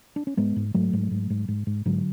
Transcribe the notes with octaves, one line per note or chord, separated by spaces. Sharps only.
D4
C#4
G#2 G#3 B3
G#2
G#2 F#3 A3
G#2
G#2
G#2
G#2
G#2
G#2 D3 F#3